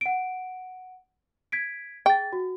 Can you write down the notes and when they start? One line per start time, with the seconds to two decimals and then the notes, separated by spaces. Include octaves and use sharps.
0.01 F#5 D7
1.52 G#6 B6 D7
2.06 G#4 G5 A6
2.33 F#4